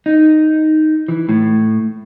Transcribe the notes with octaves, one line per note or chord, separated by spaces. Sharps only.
D#4
E3
A2